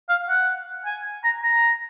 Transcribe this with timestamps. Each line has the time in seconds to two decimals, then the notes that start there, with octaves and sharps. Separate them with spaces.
0.09 F5
0.29 F#5
0.86 G#5
1.24 A#5
1.43 A#5